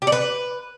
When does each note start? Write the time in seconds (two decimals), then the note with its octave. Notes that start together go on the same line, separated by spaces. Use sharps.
0.02 G4
0.07 D5
0.12 B4